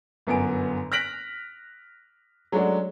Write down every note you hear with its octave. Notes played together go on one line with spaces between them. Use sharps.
G1 F#2 B3 G#5 D7
F6 F#6 A#6 B6 D7 F#7
F#3 G#3 A3 C#4 D4 F#4